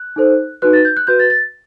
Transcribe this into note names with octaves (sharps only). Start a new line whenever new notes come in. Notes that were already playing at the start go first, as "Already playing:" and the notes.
Already playing: F#6
D#4 A4 C5
D#4 F#4 B4 F#6
A6
G6
F#6
F#4 B4 G6
A6
A6